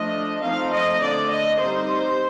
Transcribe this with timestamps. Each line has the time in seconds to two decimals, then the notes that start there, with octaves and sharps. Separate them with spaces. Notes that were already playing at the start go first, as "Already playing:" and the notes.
Already playing: F3 A3 D4 D#5
0.42 F3 A3 C4 D#4 F5
0.71 D#5
1.00 D3 A3 D4 D5
1.30 D#5
1.59 G3 C4 D#4 C5